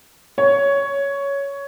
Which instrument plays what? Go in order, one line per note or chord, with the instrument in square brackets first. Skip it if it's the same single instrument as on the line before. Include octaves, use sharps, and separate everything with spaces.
[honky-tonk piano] C#5